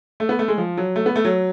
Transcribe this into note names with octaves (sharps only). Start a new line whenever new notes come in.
A3
B3
A3
G#3
F3
F#3
A3
B3
A3
F#3